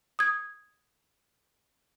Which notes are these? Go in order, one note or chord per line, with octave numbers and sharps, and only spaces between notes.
D#6 G#6